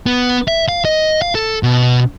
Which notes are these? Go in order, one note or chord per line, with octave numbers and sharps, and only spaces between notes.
B3
E5
F5
D#5
F5
A4
B2